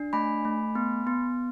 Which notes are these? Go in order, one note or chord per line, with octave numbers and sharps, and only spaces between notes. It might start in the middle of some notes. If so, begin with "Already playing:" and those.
Already playing: D4
A3 G#5 B5
A3
B3
B3